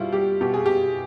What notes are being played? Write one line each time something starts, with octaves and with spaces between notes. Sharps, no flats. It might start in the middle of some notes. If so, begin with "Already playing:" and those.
Already playing: B2 G3 E4 F4
G3 G4
B2 G4
G#4
B2 G4